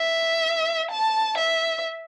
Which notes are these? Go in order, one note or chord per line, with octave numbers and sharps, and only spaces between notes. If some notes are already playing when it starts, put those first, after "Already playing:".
Already playing: E5
A5
E5